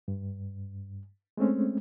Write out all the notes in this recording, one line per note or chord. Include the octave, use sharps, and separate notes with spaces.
G2
G#3 A3 C4 C#4